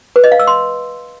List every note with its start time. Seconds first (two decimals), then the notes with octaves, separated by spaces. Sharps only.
0.16 B4
0.24 D#5
0.32 F5
0.40 E6
0.47 C6